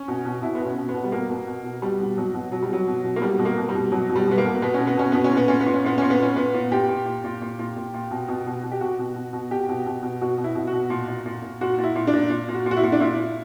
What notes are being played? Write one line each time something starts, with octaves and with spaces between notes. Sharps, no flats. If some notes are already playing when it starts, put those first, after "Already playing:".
Already playing: C#4
B2
B2
B2 E4
B3
B2 C#4
B2
B3
B2
G3
B2 A#3
B2
B2
B2
B2 G3
B2
B2 F#3
B2
B2 F#3
G3
B2 F#3
B2
B2
A#3
B2 G3
B2
A#3
B2
G3
B2
B2 F#3
B2
G3
B2 B3
A#3
B2
B2 B3
B2 C#4
B3
B2 C#4
B2 B3
C#4
A#2 B3
A#2 C#4
B3
A#2
C#4
A#2 B3
A#2 C#4
B3
A#2 C#4
A#2 B3
A#2
A#2 G4
A#2
A#2
A#2
A#2
A#2
A#2
A#2
B2
B2
B2
B2
G4
B2 F#4
B2
B2
B2
B2 G4
B2
B2
B2
B2 F#4
B2
E4
B2
F#4
B2
A#2
A#2
A#2
A#2
A#2 F#4
A#2
E4
A#2
D4
A#2
A#2
A#2
F#4
A#2
F#4
E4
A#2
D4
A#2 E4
A#2